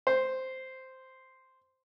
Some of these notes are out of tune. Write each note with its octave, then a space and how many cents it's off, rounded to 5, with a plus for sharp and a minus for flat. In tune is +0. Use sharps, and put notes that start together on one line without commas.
C5 -5